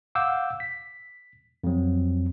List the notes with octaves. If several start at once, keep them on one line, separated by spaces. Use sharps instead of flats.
F5 F#5 D6 E6 G6
B6
F2 F#3